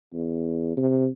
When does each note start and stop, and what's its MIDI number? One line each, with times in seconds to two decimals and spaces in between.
0.14 0.75 40
0.77 1.08 48